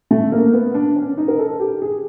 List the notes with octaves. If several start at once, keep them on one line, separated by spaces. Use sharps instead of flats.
A3
A#3
B3
D4
C#4
D#4
A#4
A4
G4
G#4